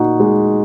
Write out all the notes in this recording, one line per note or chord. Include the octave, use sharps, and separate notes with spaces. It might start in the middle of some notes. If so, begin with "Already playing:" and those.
Already playing: A#2 D#4 F#4
G#3